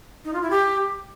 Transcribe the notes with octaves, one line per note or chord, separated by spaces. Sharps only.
D#4
F4
E4
G4